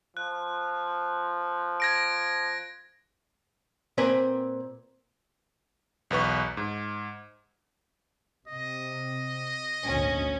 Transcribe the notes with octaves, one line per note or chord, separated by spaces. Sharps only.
F3 F#6
G#6 A#6 D7
A#2 C4 B4 C5 G#5 A#5
B1 E2 B4 C#6
G#2
C3 D#5
G#1 D2 A#2 C#4